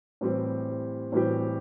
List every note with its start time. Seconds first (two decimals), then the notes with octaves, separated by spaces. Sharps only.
0.21 A2 E3 G3 C4 G4
1.12 A2 E3 G3 C4 G4